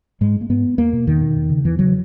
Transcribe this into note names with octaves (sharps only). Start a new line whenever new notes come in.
G#2 G#3
A#3
G#2 B3
E2 A#3
B2
E2 D#3
B2
E2
C#3
E2 E3
C#3 F#3